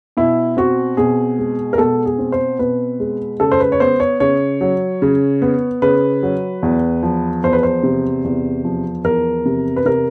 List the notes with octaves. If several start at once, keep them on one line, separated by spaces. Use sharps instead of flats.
B2 E4
C4 F#4
B2 G#4
G#3
A#4
B2 A4
G#4
C4
C5
B2 B4
G#3
C#3 A4
C5
B4
C#5
B3 C5
C#5
C#3 C#5
F#3
C#3
B3
C#3 B4
F#3
E2
F3
E2 C5
B4
C5
C3
E2
F3
E2 A#4
C3
B4
C3 A#4